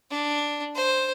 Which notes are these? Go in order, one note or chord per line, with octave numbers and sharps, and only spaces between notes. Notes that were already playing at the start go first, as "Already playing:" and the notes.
D4
C5